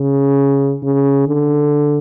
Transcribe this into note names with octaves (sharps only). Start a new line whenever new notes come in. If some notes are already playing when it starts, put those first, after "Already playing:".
Already playing: C#3
C#3
D3